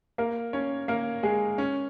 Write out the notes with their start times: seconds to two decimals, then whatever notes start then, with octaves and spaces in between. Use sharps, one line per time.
0.18 A#3 A#4
0.53 C#4 C#5
0.88 A#3 A#4
1.23 G#3 G#4
1.58 C#4 C#5